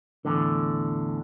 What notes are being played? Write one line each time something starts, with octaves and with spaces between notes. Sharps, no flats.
E2 A2 D3